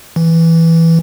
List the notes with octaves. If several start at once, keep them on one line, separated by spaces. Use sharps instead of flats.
E3